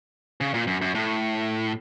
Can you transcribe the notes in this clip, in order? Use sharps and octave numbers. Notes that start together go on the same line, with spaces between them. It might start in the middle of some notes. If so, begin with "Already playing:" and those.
C#3
A#2
F#2
F#2
A2